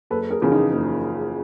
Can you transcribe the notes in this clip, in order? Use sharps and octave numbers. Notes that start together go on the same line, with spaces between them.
F#1 A4 B4
G#4 A#4
E2 C#3 F3
D#4 F4
F#1